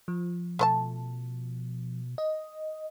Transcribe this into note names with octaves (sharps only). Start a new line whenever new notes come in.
F3
B2 A3 C5 A5
D#5